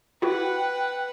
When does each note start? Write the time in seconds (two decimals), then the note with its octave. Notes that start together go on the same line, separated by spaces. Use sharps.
0.22 E4 F#4 B4 F#5 G5